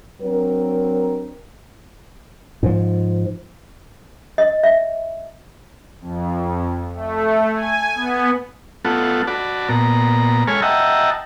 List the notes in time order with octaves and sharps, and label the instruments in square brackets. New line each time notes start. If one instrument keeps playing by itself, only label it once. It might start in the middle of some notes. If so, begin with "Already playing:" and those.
[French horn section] F#3 C4 D4 A#4
[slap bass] G#2 F3
[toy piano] D#5
E5
[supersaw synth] F2
A3
G#5
B3
[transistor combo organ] A3 B3 F4 A4 F#5
F#4 D5 A5 B5
A#2 B3 A#5
G#3 A4 C#5 G#5 B5 F6
D#5 E5 F#5 G5 A5 A#5